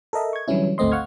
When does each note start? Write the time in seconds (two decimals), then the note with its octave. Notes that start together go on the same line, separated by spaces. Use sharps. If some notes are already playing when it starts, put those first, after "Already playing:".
0.13 A4 A#4 D#5 E5
0.33 C#6 G#6
0.48 D3 E3 F#3 G3 C#4 E4
0.78 G#1 D2 A3 C4 D#5 C6
0.92 F5 F#5 C#6 F6 G#6